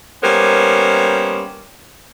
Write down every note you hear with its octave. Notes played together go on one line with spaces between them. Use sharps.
G3 A#3 B3 C#4 A#4 C5